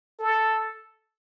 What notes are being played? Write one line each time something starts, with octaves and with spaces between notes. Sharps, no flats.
A4